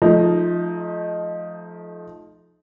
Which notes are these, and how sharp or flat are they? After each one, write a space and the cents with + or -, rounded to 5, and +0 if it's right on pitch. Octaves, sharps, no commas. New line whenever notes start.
F3 +0 A3 -35 D#4 +0